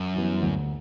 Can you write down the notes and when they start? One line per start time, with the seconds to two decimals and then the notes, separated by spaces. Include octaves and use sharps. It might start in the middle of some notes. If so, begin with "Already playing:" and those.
Already playing: F#2
0.14 E3 G3 B3
0.42 D2